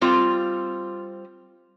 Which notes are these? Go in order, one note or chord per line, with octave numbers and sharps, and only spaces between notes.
G3 C4 F4